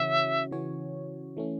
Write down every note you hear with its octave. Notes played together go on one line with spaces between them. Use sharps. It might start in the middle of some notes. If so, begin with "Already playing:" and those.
Already playing: C#3 E3 C#4 F#4 C#5 E5
C#3 E3 C#4 F#4 C#5
E3 A3 C#4